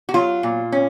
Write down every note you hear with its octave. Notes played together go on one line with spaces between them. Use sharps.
F#4
F#3 F4
A#2
C#4